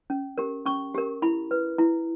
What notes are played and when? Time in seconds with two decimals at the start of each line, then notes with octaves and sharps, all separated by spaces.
0.10 C#4
0.38 G4 A#4
0.66 C#4 C#6
0.94 G4 A#4
1.22 E4 B5
1.51 B4
1.78 E4